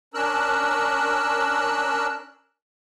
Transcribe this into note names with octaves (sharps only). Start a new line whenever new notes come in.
C#4 D4 A#4 E6 F#6